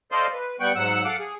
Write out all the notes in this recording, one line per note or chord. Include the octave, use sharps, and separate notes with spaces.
A4 C5 D5 D#5 F5 C6
B4
G3 B3 G5 C#6 F#6
G#2 F#3 F#5 E6
A4 F5 F#5 D6
G#4